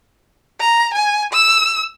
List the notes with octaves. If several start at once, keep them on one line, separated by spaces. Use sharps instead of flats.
A#5
G#5
E6